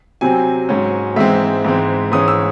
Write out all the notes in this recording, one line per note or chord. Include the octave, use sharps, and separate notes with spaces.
C3 F#3 C4 G#5
G#2 F#3 C#4
G#2 E3 G#3 C4 E5
G#2 E3 G#3 C4
G#2 E3 G#3 C#4 D#6
E6